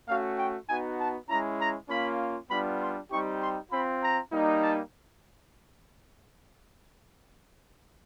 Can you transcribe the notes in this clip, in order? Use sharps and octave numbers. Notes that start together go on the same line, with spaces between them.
A3 C#4 F#4 F5
G5
B3 D#4 F#4 G#5
A5
G#3 C#4 E4 A#5
A#5
A#3 C#4 F4 B5
G3 B3 D4 F4 B5
C6
G3 C4 D#4 G4 C#6
C6
C4 F4 B5
A#5
G3 A#3 D#4
A5